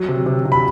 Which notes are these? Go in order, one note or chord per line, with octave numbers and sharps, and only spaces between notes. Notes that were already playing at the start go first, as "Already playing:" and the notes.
Already playing: F#3
C3
C3
C3
B5